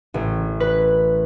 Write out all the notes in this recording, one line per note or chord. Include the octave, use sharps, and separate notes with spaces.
A1
B4